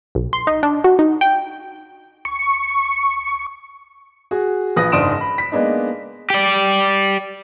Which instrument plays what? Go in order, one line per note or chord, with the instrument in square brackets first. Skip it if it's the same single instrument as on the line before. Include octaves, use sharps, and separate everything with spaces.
[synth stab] B1
C6
D#4
D4
F#4
D#4
G5
[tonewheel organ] C#6
[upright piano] F#4 G#4
A#1 F3 B4 D#6 A#6
F#1 G#2 D4 D#6 D7 E7
B5
B6
G#3 A#3 B3 D4 D#4
[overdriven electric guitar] G4 D5